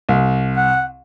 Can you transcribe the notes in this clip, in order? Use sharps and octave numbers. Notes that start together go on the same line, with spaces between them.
C2
F#5